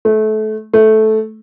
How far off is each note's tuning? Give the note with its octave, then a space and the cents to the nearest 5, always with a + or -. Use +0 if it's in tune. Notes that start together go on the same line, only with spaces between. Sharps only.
A3 -25
A3 -10